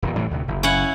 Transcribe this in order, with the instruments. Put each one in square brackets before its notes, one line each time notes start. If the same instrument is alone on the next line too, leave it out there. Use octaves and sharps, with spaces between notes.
[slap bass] D#1 E2 C3
A2 E3 G3
D2 C3
F#1
[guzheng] C#4 E4 F#5